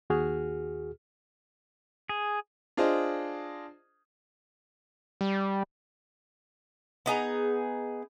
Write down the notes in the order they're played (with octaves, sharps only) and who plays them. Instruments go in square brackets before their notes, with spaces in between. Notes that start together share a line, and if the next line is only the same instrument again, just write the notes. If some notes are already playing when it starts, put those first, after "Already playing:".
[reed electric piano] D#2 F#4 G#4 F6
[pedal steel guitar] G#4
[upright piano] D4 F4 G#4 C5 D#5
[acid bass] G3
[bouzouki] B3 D#4 G#4 A#5